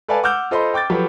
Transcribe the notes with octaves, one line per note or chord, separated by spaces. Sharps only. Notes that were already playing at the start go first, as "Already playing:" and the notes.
A4 B4 D5 F5 G#5 A5
F#5 D6 E6 F6 G6
F4 A4 C5 D#5 B5 C6
G5 D6 G6 A6
F3 F#3 G4 A4 B4